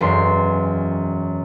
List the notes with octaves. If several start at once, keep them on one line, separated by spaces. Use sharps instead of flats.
E1 F#2 C6